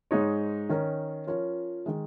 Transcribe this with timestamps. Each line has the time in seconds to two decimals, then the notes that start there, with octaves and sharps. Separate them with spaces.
0.11 G#2 G#3 D#4 C#5
0.70 D#3 C#4 A#4
1.27 F3 C#4 F4 A#4 C#5
1.86 D#3 G#3